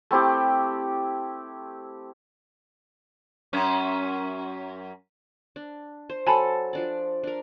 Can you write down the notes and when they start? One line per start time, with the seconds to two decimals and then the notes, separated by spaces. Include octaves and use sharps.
0.11 A3 C4 E4 G4
3.53 F#2 C#4
5.56 D4
6.10 C5
6.27 F#3 A4 G#5 A5 B5
6.73 F3 D4 D5
7.24 D4 A#4